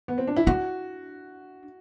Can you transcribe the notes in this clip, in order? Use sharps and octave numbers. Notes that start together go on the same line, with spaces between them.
B3
C4
D4
E4
D4 F#4